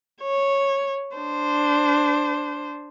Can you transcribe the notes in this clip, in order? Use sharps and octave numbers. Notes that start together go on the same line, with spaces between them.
C#5
D4 C5